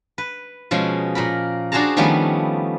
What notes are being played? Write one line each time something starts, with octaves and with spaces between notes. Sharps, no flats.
B4
B2 F3 G#3 C#4
A#2 A#4 B5
D4 F#4 G#4 C5 A5 A#5
D#3 F3 G3 A3 B3 C#4